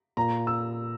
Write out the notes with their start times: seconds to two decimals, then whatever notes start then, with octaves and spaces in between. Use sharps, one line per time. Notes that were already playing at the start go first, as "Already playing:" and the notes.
0.17 A#2 A#5
0.47 E6